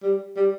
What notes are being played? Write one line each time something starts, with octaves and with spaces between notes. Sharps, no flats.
G3
G3